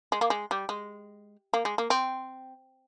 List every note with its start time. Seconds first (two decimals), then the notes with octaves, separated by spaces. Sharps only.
0.12 G#3
0.21 A#3
0.30 G#3
0.51 G3
0.69 G#3
1.54 A#3
1.65 G#3
1.78 A#3
1.90 C4